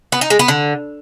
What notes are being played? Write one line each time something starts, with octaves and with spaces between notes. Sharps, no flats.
B3
D#4
G#3
B3
D3